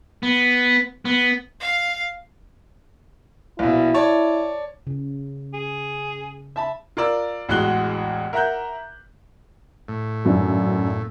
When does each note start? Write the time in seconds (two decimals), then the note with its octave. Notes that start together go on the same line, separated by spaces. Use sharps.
0.23 B3
1.05 B3
1.60 F5
3.59 A#1 B2 E4
3.94 C#5 D5 A5
4.87 C#3
5.54 G#4
6.56 E5 A5 B5
6.97 F4 A#4 D5 E6
7.49 A1 E2 G#3 F#4 F#6 G7
8.33 A#4 E5 F#5 A#5 F#6 G6
9.88 A2
10.25 G#1 F#2 D4